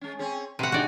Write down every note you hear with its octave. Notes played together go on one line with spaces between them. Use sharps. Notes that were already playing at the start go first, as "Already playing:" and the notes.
G#3 C#4
C4 C#4 G#4
C3 C4 F#4 B4 F#5
D4 D#4 F#4 G#4 D5